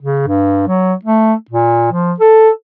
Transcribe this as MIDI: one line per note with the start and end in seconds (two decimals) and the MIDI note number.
0.02 0.23 49
0.27 0.63 43
0.68 0.94 54
1.05 1.34 57
1.51 1.89 46
1.92 2.13 53
2.20 2.49 69